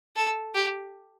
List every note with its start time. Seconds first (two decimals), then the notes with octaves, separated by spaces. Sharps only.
0.16 A4
0.55 G4